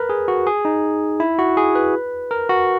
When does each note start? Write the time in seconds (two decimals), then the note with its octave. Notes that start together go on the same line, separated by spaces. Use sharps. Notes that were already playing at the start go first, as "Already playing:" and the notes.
Already playing: A#4 B4
0.09 G#4
0.28 F#4
0.47 G#4
0.65 D#4
1.20 E4
1.39 F#4
1.57 G#4
1.75 B4
2.31 A#4
2.49 F#4